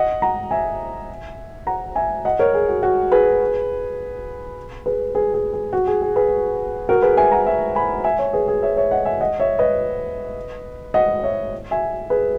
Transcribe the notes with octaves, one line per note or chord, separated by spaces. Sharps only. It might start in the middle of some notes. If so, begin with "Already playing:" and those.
Already playing: D#5 F#5
F#5 A#5
E5 G#5
F#5 A#5
E5 G#5
D#5 F#5
A#4 C#5
G#4
F#4
F#4
G#4 B4
G#4 B4
G#4 B4
G#4
G#4
F#4
G#4
G#4
G#4 B4
F#4 A#4
G#4 B4
E5 G#5
F#5 A#5
E5 G#5
G#5 B5
E5 G#5
C#5 E5
G#4 B4
G#4
C#5 E5
C#5 E5
D#5 F#5
E5 G#5
D#5 F#5
C#5 E5
B4 D#5
D#5 F#5
C#5 E5
E5 G#5
G#4 B4